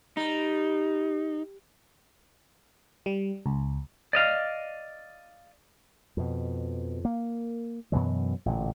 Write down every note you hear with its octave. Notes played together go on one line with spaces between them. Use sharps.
G3 D#4
G3
C#2
D5 D#5 F5
F2 B2
A#3
F#2 B2 E3 F#3
A1 A#2 D3